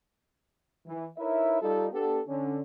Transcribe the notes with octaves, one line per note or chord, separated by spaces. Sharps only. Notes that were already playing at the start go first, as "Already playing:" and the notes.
E3
D#4 E4 A#4 B4 C#5 E5
G3 D#4 F4 A4
B3 D4 G4 A4
D3 C#4